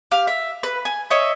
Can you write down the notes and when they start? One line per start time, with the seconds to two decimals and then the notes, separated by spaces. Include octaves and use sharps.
0.11 G4 F5 F6
0.27 E5
0.63 B4
0.85 G#5
1.10 C#5 D#5 E5